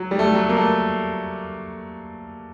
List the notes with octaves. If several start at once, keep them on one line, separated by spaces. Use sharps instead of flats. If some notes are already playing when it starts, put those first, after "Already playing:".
Already playing: F#3
G3
A3
G3
F#3
A#3
A3